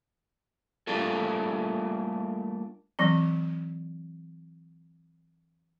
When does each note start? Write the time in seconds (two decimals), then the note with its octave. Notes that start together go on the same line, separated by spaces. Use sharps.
0.87 G3 A3 A#3 D4 F4 A4
2.99 E3 F#3 C4